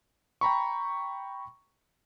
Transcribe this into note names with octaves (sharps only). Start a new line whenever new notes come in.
G5 A#5 B5 C#6